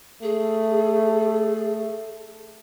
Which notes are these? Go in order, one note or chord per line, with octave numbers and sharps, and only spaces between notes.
A3 G#4